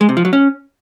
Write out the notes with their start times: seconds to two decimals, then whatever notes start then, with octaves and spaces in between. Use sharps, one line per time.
0.01 G#3
0.09 C3
0.17 F3
0.25 F#3
0.33 C#4